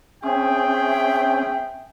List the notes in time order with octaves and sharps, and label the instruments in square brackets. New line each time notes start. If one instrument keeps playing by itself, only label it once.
[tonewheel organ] C4 C#4 [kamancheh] G#4 [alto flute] E5 [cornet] G5